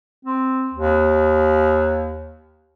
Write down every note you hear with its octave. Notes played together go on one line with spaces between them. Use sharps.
C4
D#2